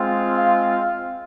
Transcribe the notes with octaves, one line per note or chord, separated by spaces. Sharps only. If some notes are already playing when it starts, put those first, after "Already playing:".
Already playing: G#3 C4 F4
F5